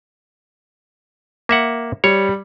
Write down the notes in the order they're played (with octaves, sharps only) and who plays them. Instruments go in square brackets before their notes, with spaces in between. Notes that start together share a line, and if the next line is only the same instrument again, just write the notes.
[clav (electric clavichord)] A#3 E5 F#5
[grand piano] G3 [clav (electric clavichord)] C#5